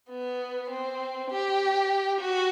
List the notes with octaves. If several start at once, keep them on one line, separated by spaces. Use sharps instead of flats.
B3
C4
G4
F#4